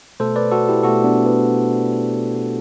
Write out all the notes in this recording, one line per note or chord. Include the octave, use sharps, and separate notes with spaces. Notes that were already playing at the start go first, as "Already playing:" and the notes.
B2 A3 A4 C5
B4 D5
F#4 A4
E4 G4
B2 A3 F#4 A4
B3 D4
B3